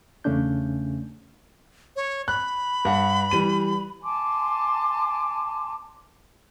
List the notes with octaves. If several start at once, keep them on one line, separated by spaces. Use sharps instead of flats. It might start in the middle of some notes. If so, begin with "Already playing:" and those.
E2 C#3 A3 C#4 D4 G6
C#5
B5 F#6
G2 F#5
E3 G3 D#7
G#5 A5 C6 D6